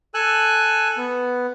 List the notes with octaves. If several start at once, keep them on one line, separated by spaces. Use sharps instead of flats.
A4 G#5 E6 F#6
B3